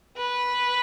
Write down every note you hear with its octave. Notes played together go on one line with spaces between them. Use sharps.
B4